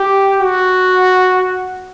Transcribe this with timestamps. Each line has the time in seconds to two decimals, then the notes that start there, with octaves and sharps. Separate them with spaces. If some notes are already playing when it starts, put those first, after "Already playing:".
Already playing: G4
0.41 F#4